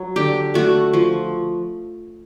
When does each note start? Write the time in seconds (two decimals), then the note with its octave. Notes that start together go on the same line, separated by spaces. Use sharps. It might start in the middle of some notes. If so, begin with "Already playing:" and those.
Already playing: F#3
0.16 D3 G4
0.54 A3 F#4
0.93 F3